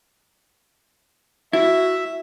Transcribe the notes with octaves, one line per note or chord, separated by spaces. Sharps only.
E4 F#4 E5